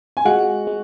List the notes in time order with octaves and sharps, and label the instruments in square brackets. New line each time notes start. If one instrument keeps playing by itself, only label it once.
[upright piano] G#5
[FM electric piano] G#3 [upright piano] F#4 F#5
[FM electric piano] G#3